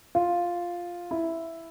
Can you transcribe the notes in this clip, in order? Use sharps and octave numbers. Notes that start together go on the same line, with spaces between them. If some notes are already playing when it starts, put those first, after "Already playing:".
F4
E4